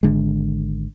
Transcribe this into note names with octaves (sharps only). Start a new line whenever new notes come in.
G#1 D3 G#3